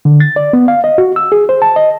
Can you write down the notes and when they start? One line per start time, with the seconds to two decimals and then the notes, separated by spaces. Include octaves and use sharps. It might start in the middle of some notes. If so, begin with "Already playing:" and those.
0.05 D3
0.20 A6
0.36 D5
0.53 B3
0.68 F5
0.84 D#5
0.98 F#4
1.16 E6
1.32 G#4
1.49 C5
1.62 A5
1.76 D#5